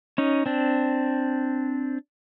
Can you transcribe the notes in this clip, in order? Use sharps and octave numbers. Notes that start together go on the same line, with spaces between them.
C#4 D#4
C4 D4